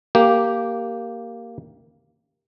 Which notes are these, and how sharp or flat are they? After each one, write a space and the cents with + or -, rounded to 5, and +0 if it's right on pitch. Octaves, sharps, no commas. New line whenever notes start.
A#3 -5 G4 -5